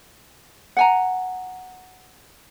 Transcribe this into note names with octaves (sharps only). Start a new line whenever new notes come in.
F#5 G#5 A#5